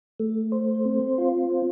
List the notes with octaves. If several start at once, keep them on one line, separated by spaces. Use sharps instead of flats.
A3
C5
C4
F4
C5